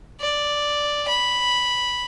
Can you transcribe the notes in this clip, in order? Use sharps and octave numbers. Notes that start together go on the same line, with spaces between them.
D5
B5